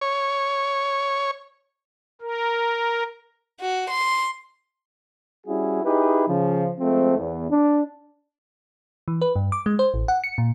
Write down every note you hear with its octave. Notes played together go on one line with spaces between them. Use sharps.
C#5
A#4
F#4
C6
G3 C#4 E4 F#4 G#4
D#4 E4 G4 G#4 B4
C#3 F3
F3 G#3 A3 C4
E2
D4
E3
B4
G2
D6
G#3
C5
A1
F#5
C#7
A#2